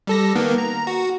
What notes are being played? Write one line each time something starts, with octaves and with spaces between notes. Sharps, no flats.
G3 A4 A#6
D#3 A#3 B3
A#5
F#4